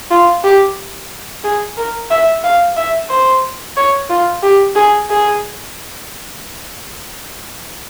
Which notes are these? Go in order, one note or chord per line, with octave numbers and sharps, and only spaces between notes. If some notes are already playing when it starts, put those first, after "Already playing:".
F4
G4
G#4
A#4
E5
F5
E5
C5
C#5
F4
G4
G#4
G#4